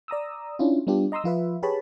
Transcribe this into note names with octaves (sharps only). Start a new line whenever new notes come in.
D5 A#5 D#6 E6
C#4 D4 E4 F4
G3 B3 D4 F4 G4
D#5 A#5 C6 D#6 E6
F3 F4 B4 E5
G4 G#4 B4 C#5 A5 B5